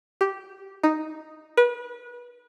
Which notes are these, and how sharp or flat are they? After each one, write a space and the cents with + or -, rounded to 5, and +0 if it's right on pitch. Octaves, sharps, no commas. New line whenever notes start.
G4 -10
D#4 +0
B4 -30